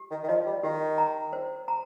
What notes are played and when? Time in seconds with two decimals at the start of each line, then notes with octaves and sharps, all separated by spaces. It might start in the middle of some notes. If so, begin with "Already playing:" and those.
Already playing: G4
0.11 D#3
0.23 D#3
0.29 F3 D#5
0.46 G3
0.63 D#3 G4
0.98 A#5
1.33 C5
1.68 A#5